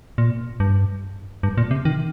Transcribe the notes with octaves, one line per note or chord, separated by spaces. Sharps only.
A#2
G2
G2
A#2
C3
D#3